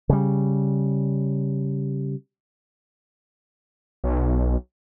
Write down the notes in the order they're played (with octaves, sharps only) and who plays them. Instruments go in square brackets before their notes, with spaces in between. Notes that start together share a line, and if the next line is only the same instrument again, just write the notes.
[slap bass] C#3 G3
[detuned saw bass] B1